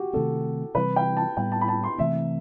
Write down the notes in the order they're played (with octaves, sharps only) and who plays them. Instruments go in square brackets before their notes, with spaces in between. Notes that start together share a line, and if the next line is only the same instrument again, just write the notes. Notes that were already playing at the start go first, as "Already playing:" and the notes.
Already playing: [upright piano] F#4 G4
[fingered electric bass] C3 D#3 A3 C4 [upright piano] A4
[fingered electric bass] C3 E3 G3 C4 [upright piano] B4
[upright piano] G5
A5
[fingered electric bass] A2 G3 B3 [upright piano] G5
[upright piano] A5
B5
A5
C6
[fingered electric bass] C3 E3 A3 C4 [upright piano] E5